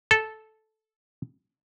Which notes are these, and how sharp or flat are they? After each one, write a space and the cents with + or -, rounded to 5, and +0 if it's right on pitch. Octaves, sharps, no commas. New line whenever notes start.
A4 -10